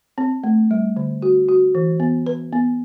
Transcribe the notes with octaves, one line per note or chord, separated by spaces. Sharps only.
C4
A3
G3
D3
F#4
F#4
E3
B3
B4
B3